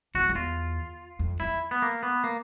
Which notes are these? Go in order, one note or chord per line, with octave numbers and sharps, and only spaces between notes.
E2 F#4
E2
F4
F2
F2 E4
B3
A#3
B3
A#3